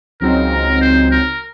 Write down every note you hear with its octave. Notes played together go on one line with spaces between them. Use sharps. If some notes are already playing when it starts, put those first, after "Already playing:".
C#2 C#3 F#3 C4 D#4 A#4
C5
A#4